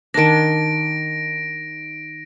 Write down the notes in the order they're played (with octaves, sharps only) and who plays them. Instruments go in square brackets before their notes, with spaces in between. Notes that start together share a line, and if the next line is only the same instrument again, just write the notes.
[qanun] D#3 D4 [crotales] A#6 D7